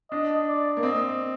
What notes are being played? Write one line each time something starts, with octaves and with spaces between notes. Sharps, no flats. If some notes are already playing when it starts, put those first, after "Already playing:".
D4 D#5
D5
A#3
C4 D#5